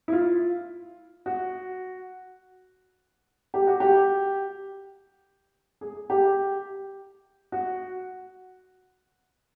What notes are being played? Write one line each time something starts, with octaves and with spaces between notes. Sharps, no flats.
E4
F4
F#4
G4
F#4
G4
G#4
G4
F#4